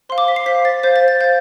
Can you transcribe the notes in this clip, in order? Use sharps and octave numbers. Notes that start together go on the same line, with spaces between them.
C5 F5 C6
D6
B6
C7
C5 F5 B6
A6
C5 F5 G6
A6
A6
C5 F5 G6